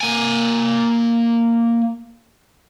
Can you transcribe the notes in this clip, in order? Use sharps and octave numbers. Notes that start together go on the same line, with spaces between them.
A#3 G#5